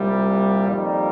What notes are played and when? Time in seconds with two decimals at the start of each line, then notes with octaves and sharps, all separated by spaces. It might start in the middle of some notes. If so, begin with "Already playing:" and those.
Already playing: C2 A#2 G3
0.68 F2 D#3 G3 A#3